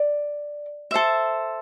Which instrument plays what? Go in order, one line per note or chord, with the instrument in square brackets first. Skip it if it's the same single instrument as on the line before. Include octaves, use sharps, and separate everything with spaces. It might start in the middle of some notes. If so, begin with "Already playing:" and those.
Already playing: [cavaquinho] D5
A4 C5 E5